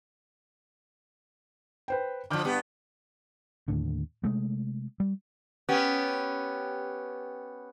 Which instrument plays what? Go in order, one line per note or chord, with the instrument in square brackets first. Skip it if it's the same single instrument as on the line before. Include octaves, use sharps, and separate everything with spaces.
[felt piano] B4 C5 G5
[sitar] D3 F3 [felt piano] D6 F6 G6
[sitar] G2 B3 G4
[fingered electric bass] D#2 A2 D3
C3 G#3 A3
G3
[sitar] B3 C#4 G4